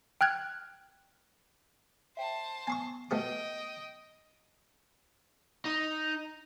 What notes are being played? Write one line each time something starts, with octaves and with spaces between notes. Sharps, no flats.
G5 F6 F#6 G#6
C5 E5 G5 A5
B3 G#5 C6 C#6
B2 A3 G4 D#5 G5
D#4